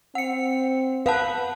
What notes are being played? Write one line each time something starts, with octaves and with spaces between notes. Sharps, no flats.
C4 F#5 C#7
B4 F5 F#5 A5